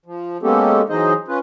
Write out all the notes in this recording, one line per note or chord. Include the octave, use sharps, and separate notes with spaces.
F3
G#3 A#3 B3 C#4 G4 A4
E3 F#3 D#4 G#4 C5 D#5
C#4 F4 B4